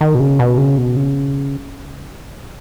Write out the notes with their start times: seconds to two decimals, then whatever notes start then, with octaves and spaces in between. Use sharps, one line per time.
0.01 D#3
0.15 B2
0.20 C#3
0.39 B2
0.57 C#3
0.78 B2
0.96 C#3